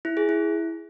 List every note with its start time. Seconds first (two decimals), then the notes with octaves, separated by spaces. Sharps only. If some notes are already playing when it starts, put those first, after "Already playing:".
0.05 E4
0.17 G#4
0.29 E4